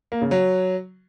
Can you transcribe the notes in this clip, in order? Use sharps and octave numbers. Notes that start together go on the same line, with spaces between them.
A#3
C#3
F#3